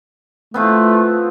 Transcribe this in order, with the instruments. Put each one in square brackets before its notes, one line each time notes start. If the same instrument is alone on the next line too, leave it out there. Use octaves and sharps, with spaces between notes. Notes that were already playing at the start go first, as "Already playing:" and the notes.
[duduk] A3 [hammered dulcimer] B3 C4 F4